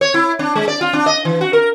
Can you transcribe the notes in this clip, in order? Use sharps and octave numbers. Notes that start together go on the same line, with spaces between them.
C#5
E4
D4
G#3
D5
F4
D4
D#5
E3
F#4
A#4